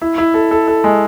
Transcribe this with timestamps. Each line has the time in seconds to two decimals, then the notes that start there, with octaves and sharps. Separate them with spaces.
0.02 E4
0.18 E4
0.34 A4
0.51 A4
0.68 A4
0.84 G#3